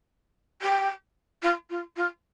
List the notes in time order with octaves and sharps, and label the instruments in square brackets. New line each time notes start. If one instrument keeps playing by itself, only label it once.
[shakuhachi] G4
F4
F4
F4